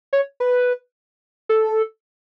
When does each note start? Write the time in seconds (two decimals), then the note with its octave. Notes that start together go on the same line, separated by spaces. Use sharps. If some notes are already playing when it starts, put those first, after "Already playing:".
0.13 C#5
0.40 B4
1.49 A4